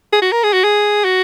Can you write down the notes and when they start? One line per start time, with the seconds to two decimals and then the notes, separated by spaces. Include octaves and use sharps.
0.13 G#4
0.22 F#4
0.32 A#4
0.43 G#4
0.53 F#4
0.64 G#4
1.05 F#4